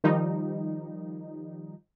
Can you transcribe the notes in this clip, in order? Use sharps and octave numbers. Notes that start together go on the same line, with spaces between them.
D#3 F3 G3 D#4